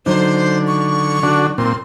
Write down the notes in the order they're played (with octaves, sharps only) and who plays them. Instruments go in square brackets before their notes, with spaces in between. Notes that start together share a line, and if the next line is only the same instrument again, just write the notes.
[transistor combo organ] D3 [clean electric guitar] F#3 D#4 [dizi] C5
[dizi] C#6
[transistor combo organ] D3 D4 F#4
[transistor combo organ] A#2 C4 [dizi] C6